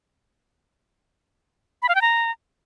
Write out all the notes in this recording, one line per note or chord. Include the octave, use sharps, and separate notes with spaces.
B5
F5
G5
A#5